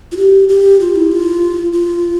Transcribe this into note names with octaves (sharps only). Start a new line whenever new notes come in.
F4
G4
G4
F4
E4
F4
F4